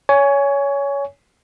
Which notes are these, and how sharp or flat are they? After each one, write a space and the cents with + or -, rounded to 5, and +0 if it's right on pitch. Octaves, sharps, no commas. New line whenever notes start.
C#5 +20 G#5 +0